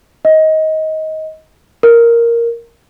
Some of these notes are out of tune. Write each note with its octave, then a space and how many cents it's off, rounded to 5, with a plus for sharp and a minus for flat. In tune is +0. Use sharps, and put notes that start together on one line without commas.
D#5 +20
A#4 +0